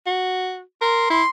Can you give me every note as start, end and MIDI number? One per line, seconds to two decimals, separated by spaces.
0.07 0.61 66
0.81 1.09 70
0.81 1.08 84
1.10 1.23 64
1.10 1.28 84